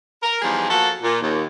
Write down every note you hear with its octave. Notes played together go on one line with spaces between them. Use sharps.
A#4
E2 F3 G3 D#4 G#4
F3 A#3 F#4 A4
A#2
D#2